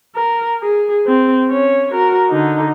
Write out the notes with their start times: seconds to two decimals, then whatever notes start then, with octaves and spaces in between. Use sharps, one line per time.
0.16 A#4
0.61 G#4
1.06 C4
1.49 C#4 C#5
1.93 F#4 A#4
2.30 D3 D#4